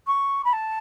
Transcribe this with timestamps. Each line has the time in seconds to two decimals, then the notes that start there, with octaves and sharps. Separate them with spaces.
0.07 C#6
0.44 B5
0.53 A5